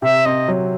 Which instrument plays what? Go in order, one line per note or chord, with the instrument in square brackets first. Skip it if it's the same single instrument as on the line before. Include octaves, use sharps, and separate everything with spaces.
[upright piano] C3 [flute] E5
[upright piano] C4 [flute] D#5
[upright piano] F#3